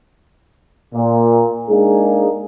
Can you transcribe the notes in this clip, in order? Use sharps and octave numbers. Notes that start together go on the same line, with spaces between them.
A#2
G#3 A#3 D4 D#4 G#4